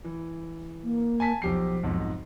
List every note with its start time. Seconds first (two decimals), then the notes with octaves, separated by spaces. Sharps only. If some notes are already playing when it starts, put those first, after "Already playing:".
0.04 E3
0.84 A#3
1.20 G#5 A5 B6
1.42 B1 F3 G4 C7
1.83 B1 F2 G#2